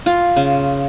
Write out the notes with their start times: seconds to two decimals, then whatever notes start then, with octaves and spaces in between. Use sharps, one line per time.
0.06 F4
0.36 C#3